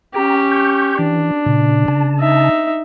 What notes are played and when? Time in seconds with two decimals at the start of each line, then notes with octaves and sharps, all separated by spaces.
0.14 C#4 G4 G5 A#5
0.51 C#6 G6
0.99 E3 D4
1.46 A#2 C#3
1.88 C#3 A5
2.19 D#4 E5